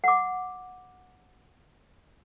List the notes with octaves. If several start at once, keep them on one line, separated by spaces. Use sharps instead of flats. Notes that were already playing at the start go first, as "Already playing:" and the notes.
F#5 D6